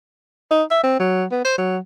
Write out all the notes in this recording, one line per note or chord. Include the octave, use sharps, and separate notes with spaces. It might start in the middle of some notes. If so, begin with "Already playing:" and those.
D#4
E5
C4
F#3
B3
C5
F#3